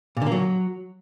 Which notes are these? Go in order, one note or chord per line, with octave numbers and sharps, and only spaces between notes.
A#2
D3
A#3
F#3